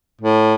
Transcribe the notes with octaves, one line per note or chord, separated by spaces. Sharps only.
A2